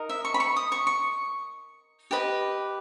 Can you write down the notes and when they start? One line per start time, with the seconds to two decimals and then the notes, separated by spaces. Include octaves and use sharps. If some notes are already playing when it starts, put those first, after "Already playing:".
Already playing: D#4 A#4 D#5
0.09 E5
0.25 C#6
0.34 B5
0.40 C#6
0.56 D#6
0.72 C#6
0.87 C#6
2.11 G4 B4 D#5